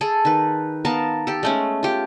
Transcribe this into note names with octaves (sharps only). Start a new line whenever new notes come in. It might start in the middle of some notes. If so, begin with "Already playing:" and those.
G#4 A4
D#3 B4
B3 A#4 F5 A5
G4 A4
G#3 A3 C#4
F4 G4